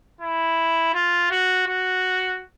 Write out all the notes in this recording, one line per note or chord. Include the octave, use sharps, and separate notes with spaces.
E4
F4
F#4
F#4